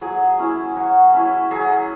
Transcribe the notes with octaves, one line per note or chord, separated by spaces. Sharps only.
F#3 G#4
C#4 E4
F#3 F#4
C#4 E4
F#3 G#4